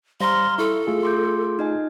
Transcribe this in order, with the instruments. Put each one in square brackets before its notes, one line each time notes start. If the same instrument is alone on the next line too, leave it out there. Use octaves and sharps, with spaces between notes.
[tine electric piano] G3 C5 A#6 [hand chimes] F5 A#5 F6 [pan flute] C6
[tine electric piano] E4 [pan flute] A4 [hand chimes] C#6
[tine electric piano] A3 F4 G#4
[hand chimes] C6 D6 G6
D#4 D#5 G#5